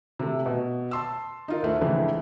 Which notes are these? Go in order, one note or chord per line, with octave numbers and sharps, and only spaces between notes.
C3 A3
B2
A5 C6 E6
D#4 F4 A#4
D2 A3
C#2 G#2 C#3 E3 F3 A3